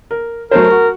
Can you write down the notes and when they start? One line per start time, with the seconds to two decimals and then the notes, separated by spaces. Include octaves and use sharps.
0.11 A#4
0.51 F#3 A3 A#4 C5
0.70 F#4